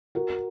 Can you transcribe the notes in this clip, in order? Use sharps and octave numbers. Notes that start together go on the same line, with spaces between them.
F#4 A#4